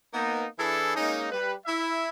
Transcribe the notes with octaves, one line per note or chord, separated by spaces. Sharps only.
A#3 B3 D#4
E3 D4 E4 G#4 A4
G#3 A#3 C#4 D#4
G3 B4
E4 E5